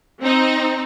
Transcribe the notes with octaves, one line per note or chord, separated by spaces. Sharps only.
C4 D#4